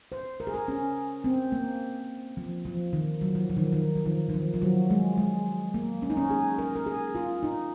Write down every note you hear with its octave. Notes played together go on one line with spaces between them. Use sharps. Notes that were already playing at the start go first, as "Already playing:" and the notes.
C5
A#4
G#4
A#4
C#4
C4
A#3
F3
F3
D#3
F#3
F3
F3
D#3
D#3
F3
D#3
D#3
F3
F3
F#3
G#3
G#3
A#3
C#4
D#4
C#4
G#4
A#4
A#4
G#4
F4
D#4